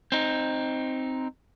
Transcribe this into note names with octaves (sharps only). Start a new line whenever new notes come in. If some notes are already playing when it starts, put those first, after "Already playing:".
C4 D#4